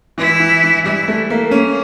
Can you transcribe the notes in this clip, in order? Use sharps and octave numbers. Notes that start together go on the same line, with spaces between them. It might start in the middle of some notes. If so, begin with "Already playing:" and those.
E3 E4
E3
E3
G3 E4
A3
A#3
A#3 C#4